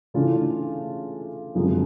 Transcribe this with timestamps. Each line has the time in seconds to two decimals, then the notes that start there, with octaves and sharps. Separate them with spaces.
0.14 C#3 E3 A3 D4 F4
1.55 F#2 D3 F3 G#3 C4